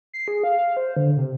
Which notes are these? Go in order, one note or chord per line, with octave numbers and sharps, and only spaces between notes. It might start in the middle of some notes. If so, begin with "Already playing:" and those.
C7
G#4
F5
F5
C5
D3
C3